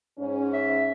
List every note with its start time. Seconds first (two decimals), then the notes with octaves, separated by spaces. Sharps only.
0.18 G#2 C#4
0.53 E5